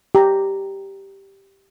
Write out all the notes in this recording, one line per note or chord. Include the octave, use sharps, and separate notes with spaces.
G4 A#5